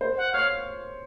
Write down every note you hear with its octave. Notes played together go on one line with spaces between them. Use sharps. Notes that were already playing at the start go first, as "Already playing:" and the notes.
C5
F#5
C#5 F5